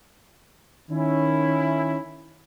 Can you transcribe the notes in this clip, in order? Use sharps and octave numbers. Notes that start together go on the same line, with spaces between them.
D#3 C#4 E4